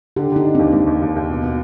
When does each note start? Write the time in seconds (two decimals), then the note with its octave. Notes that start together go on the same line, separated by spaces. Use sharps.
0.16 D3 G4
0.32 D3 D#4
0.45 D4
0.55 D#2 C4
0.73 D#2 G#3
0.87 D#2
1.02 D#2
1.16 D#2
1.30 B2
1.43 B2